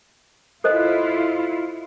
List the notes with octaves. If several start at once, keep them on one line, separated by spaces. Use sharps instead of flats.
E4 F4 A4 C5 D#5